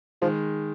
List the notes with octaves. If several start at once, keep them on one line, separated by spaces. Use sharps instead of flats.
D#3 F3 G#3